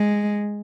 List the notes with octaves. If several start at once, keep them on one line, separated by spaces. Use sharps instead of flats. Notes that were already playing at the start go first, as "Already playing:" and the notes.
Already playing: G#3